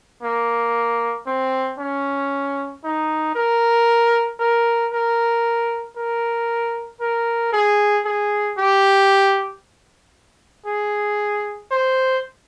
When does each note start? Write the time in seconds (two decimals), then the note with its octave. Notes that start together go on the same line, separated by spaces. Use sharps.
0.23 A#3
1.27 C4
1.79 C#4
2.84 D#4
3.35 A#4
4.40 A#4
4.93 A#4
5.96 A#4
7.00 A#4
7.53 G#4
8.05 G#4
8.58 G4
10.66 G#4
11.71 C5